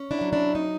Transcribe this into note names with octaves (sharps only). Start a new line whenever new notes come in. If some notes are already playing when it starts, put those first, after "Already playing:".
Already playing: C#4
D4 E4
F#3
D4 E4
D#4